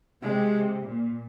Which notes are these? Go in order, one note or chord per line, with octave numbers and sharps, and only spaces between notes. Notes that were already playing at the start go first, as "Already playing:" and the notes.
C3 G#3
A#2